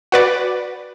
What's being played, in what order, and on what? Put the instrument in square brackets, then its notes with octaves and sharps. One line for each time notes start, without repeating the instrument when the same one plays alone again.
[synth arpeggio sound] F#4 B4 D5